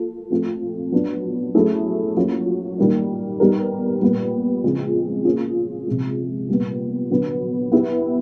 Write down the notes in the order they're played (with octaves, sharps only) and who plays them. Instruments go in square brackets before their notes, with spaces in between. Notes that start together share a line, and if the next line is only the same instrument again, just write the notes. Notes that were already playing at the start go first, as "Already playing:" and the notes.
Already playing: [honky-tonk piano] A#3 F4 A4
F3 A3 C4 F4
F#3 B3 D4
F#3 A3 C#4 E4 G#4
F#3 A#3 C#4 F4
D#3 G3 A#3 D#4
G3 B3 D#4 G4 A#4
A#2 G3 B3
C#3 F3 G#3 C4 F4
A#3 C#4 F4 G#4
C3 F3 G#3
A#2 G3 B3
D3 F#3 B3
B3 E4 G4 B4